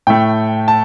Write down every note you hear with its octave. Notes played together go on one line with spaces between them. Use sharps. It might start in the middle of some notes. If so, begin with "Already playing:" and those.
A2 A3 G5
A5